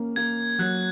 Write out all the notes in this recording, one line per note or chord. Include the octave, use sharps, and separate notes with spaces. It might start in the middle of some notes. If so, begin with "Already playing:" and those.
Already playing: A#3 C#4
A#3 G#6
F#3 F#6